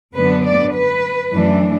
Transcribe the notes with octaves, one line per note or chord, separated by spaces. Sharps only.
F#2 D3 B3 D4 B4
D5
B4
F#2 E3 A3 D4